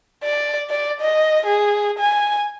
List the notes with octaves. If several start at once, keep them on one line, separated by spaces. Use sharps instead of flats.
D5
D5
D#5
G#4
G#5